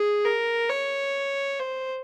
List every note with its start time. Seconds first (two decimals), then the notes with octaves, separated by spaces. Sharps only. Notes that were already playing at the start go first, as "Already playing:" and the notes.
Already playing: G#4
0.25 A#4
0.70 C#5
1.59 C5